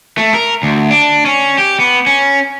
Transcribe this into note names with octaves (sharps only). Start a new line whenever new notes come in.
A3
A#4
D2
D4
C#4
G4
B3
C#4